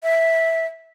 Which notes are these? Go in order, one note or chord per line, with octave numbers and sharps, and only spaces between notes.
E5